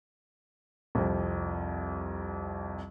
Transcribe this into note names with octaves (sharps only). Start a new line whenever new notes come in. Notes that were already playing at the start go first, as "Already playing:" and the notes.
C2 F2